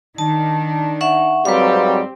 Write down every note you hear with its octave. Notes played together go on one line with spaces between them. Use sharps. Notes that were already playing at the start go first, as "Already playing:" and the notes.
D#3 D4 A5
E5 F#5 C#6
G#2 F#3 G3 C4 G4 B4 F5